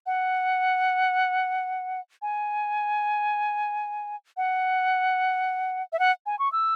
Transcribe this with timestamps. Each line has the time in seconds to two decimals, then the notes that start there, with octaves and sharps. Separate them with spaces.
0.06 F#5
2.22 G#5
4.37 F#5
5.92 E5
5.99 F#5
6.26 G#5
6.39 C#6
6.52 E6